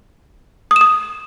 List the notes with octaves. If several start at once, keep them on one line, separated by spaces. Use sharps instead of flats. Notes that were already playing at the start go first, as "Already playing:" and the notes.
D#6
E7
D#6